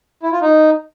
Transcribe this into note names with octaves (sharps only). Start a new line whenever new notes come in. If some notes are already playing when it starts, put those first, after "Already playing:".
E4
F4
D#4